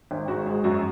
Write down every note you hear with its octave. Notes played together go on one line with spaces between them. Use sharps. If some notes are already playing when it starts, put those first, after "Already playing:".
G#1
G#2 F#4
G#3
F#2 F#4